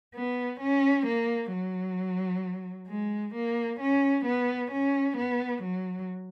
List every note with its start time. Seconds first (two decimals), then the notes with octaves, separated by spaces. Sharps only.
0.14 B3
0.60 C#4
1.06 A#3
1.52 F#3
2.88 G#3
3.34 A#3
3.79 C#4
4.25 B3
4.71 C#4
5.17 B3
5.62 F#3